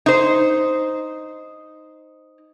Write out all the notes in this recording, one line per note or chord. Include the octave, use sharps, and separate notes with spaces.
D#4 C5